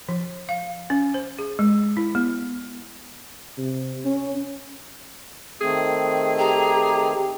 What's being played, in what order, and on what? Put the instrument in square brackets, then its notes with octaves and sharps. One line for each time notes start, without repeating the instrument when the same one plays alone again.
[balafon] F3
F5
C#4
C5
G#4
G#3
E4
B3
[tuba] C3
C#4
[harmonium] D#3 A3 C4 [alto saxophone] G#4
[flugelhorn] G4 [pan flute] A#5